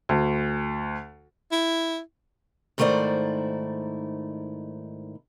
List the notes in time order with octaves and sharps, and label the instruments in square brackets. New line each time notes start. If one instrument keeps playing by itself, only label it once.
[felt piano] D2
[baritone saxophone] E4
[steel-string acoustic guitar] G#2 D#3 A3 E4 C5 D5